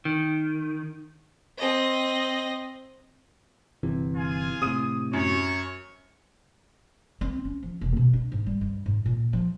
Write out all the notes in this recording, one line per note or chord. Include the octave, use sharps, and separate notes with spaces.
D#3
C4 D#5
G1 C3 E3
F4 G#4 G#5
A2 C3 D#6 D#7
F#2 C#5
C4
C#4
F3
E1
B2
D4
G#2
G3
G2
G#2
A#2
F3